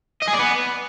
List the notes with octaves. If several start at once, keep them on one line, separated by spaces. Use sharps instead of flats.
D#5
G#4
D5
B3